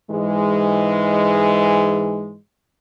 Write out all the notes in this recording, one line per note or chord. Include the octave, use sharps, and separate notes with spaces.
G#2 E3 G#3